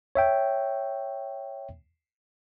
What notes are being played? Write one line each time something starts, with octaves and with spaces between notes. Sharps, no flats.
C#5 E5 G5